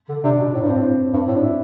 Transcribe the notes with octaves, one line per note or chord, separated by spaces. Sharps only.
D3
C3 D4
B2
A2 D4
G2
A2 C4
C4
G2
A2
D4
E4